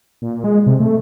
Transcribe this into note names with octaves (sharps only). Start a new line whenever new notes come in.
A#2
G#3
C3
A3